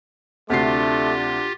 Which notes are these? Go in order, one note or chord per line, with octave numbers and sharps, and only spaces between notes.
D2 C3 A3 D4 F4 G4 C7